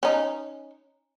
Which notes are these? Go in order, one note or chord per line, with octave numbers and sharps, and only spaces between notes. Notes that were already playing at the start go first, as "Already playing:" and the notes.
C#4 D#4